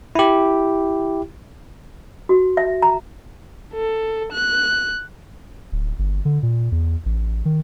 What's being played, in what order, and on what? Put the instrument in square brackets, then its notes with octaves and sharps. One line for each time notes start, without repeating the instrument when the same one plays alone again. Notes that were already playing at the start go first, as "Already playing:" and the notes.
[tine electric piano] E4 G4
[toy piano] F#4
E5
A#5
[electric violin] A4
F#6
[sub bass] D1
G1
D3
A#2
E2
A1
D#3